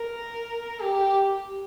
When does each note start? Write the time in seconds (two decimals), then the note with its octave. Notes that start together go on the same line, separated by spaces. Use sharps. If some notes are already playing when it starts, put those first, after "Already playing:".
Already playing: A#4
0.80 G4